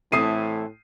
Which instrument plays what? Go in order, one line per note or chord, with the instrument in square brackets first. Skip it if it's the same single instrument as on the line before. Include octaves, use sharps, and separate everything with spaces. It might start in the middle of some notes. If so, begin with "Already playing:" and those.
[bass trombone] A2 [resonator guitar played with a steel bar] E3 A3 C4 [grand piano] D#6 C7 D#7